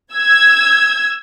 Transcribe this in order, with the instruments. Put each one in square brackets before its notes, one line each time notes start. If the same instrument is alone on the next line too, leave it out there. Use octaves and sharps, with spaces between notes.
[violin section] E6 G#6